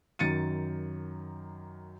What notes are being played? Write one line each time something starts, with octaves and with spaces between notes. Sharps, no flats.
F#2 D#3 A6 C#7 D#7